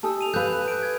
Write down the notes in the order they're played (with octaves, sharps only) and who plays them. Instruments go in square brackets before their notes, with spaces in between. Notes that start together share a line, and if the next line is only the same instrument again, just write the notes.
[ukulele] D#4 G4 A4 [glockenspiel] G#5 D#6 E6
[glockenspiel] D#7 F7
[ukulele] G4 F5 [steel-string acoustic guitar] A4 B4 [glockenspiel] E6 F#6 G6
[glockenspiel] G6 D7
G#6